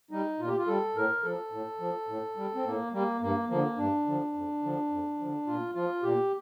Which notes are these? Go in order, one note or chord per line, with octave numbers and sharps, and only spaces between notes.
G3 D#4
A#2 F4
G4
F4
G3 A4
A2 A#4
F3 A4
A2
F3
A2
G3
C4
A2 A#3
G3 A#3
G2 A#3
D3 F3 A#3
G2 D4
D3 F3
F2
D3 F3
F2
D3 F3
A#2 F4
F3 F4
A#2 G4